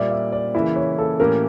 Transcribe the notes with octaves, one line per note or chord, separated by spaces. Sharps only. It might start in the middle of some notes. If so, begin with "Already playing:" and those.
Already playing: A#2 G3 A#3 D5 E5
E5
D5
C#3 E3 A#3 E4
C#5
A4
A2 E3 A#3 C#4 G4 A#4